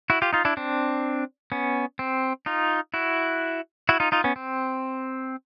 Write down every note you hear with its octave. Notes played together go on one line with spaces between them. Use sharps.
E4 F#4
F4 G4
D#4 F4
D4 E4
C4 D4
B3 C#4
C4
D#4 F4
E4 F#4
E4 F#4
D#4 F4
D#4 F4
B3 C#4
C4